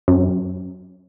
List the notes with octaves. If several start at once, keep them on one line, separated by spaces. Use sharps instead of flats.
F#2